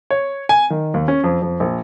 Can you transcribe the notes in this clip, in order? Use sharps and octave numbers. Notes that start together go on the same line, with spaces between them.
C#5
G#5
D#3
D#2
C#4
F2
F2
A#1